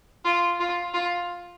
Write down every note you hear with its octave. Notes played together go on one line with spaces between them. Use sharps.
F4
F4
F4